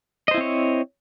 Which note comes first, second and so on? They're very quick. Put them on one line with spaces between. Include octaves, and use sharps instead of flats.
D#5 C5 E4 C4 C#5